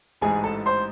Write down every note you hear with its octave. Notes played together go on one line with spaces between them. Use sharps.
A1 G#2 E3 G#4 G#5
A4 A5
C5 C6